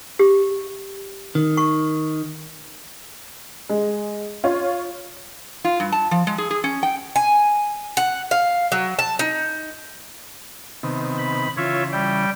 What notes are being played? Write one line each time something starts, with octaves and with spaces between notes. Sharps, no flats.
G4
D#3
C#6
G#3
F4 C#5
F4
G2
A5
F3
G#3
G#4
G#4
C#4
G5
G#5
F#5
F5
F#3
A5
D#4
C3 D#3 B3
B5
C#3 E3 F4 C#5 E5
G3 G5